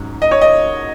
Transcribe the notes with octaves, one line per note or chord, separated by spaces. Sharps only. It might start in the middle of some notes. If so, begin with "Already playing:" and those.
Already playing: G#2 F#3 C#4
D#5
C#5
D#5